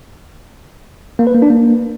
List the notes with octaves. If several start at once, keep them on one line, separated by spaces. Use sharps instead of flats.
A#3
B4
A#3
D4
A#3